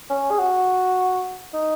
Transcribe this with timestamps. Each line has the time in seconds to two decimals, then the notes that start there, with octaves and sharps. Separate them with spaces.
0.10 C#4
0.31 G#4
0.39 F#4
1.54 D#4